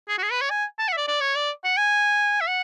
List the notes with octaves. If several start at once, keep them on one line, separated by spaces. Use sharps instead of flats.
G#4
F#4
G#4
B4
C#5
G#5
A5
F#5
E5
D5
D5
C#5
D5
F#5
G#5
E5
F#5